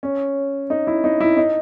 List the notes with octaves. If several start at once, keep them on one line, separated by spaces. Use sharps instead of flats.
C#4
D#4
E4
D#4
E4
D#4